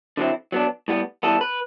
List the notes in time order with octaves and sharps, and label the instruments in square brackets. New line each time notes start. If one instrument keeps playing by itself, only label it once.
[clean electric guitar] D3 F#3 C4 E4
F#3 B3 D4
A2 G3 B3
E3 G3 B3 A4
B4